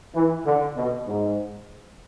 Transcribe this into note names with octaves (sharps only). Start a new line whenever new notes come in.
E3
D3
B2
G#2